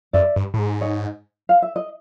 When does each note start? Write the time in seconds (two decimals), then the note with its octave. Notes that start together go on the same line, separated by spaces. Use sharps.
0.13 F#2 D5 E5
0.36 G2
0.54 A2
0.59 G#2
0.81 C#5 D#5
1.49 F5
1.62 E5
1.76 D#5